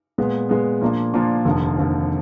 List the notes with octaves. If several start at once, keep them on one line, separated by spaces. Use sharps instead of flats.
A#2 G#3 B3
A#2 G#3 B3
A#2 F3 A#3 D4 F4
A#2 F3 A#3 D4 F4
F1 D#2 D3 F3
F1 D#2 D3 F3